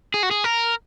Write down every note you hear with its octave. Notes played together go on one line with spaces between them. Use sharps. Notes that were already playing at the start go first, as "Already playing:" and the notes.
G#4
F#4
G#4
A#4